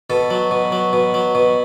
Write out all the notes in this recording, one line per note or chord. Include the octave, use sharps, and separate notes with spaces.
B2 A4
F#3
B2
F#3
B2
F#3
B2